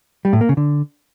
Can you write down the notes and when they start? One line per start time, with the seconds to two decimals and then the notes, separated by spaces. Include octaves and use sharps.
0.25 G3
0.33 A2
0.41 A#3
0.49 C#3
0.57 D3